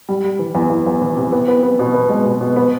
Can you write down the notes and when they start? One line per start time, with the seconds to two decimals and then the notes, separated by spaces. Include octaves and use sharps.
0.09 G3
0.24 G3
0.39 E3
0.55 E2
0.70 E2
0.86 E2
1.01 E3
1.17 C3
1.32 B3
1.48 B3
1.63 B3
1.79 B2
1.94 B3
2.09 G#3
2.25 B2
2.41 B2
2.56 B3